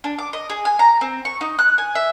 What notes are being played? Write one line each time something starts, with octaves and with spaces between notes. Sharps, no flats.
D4
D6
D#5
G#4
G#5
A#5
C4
C#6
D#4
F#6
G#5
E5